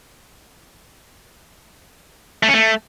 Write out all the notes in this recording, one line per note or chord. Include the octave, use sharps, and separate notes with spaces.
A3
C#4
A3